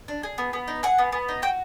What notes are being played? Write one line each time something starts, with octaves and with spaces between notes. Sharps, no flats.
D4
G#4
B3
B3
D#4
G#4 F#5
B3
B3
D#4
F#4 G5